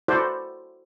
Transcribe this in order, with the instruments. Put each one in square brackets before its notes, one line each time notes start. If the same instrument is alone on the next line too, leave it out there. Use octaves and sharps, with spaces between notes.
[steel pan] E4 F#4 A4 C5 D5